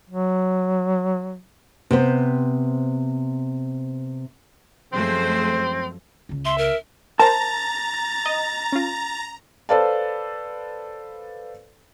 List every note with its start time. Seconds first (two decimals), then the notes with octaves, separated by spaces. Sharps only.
0.10 F#3
1.91 C3 B3 C5
4.92 F#2 F3 G#3 A3 C4 C5
6.29 C#2 C#3
6.45 E5 C6
6.58 A#4
7.20 A#4 C5 A5 A#5 A6
8.26 D#5
8.72 C#4 F4
9.69 A4 B4 C5 D5 F5 A5